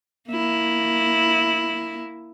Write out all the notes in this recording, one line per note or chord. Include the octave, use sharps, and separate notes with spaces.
A#3 E4